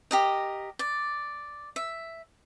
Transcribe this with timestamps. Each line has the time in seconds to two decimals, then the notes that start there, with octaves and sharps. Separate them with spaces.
0.11 G4 A#4 D#5
0.79 D5
1.76 E5